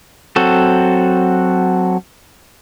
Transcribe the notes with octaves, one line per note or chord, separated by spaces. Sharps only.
F#3 C4 F#4 A4